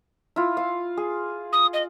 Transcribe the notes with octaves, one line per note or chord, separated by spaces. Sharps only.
E4 F4
F5
G#4
D#6
D#5